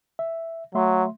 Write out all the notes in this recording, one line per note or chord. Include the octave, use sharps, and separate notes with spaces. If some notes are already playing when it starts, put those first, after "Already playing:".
E5
F#3 A3 E5 C6